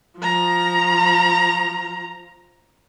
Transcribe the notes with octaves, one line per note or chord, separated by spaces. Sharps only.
F3 A#5